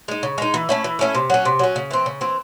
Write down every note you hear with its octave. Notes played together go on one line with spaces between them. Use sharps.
G#3 D#4
C#3
G#3 D#4
E3
A3 C#4 E4
E3
A3 C#4 E4
C3
F#3 C#4
C3
F#3 C#4
C#3
E3 C4
C#3
E3 C4